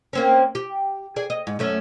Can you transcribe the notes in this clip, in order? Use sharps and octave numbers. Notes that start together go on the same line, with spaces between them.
A#3 C4 C#4
G4
G#4 D5
D#5
G#2
F#2 A3 C#4